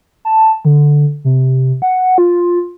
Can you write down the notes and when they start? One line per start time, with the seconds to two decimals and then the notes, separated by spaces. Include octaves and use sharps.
0.25 A5
0.65 D3
1.25 C3
1.82 F#5
2.18 F4